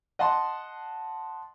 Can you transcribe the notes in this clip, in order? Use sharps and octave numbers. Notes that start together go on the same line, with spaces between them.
D#5 F#5 A5 C6